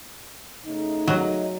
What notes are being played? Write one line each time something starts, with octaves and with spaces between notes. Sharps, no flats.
C#3 A3 D#4
F#3 D#5